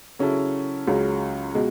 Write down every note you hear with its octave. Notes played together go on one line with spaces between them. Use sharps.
C#3 F#3 C#4 E4 A4
C#2 C#3 F#3 C#4
B2 G#3